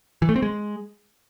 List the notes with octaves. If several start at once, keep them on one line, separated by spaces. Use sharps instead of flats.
E3
A3
C4
G#3